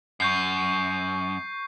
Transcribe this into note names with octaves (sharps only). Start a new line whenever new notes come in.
F#2 C#6 G6 C7